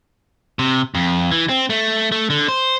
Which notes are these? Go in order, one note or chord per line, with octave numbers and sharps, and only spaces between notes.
C3
F2
E3
C4
A3
A3
D3
C5